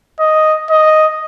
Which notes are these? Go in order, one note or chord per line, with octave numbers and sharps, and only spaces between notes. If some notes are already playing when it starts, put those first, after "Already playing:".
D#5
D#5